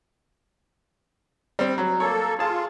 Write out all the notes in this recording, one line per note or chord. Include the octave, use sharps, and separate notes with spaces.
G3 C4
F#3
A#3 A4 C#5
F4 G#4 A5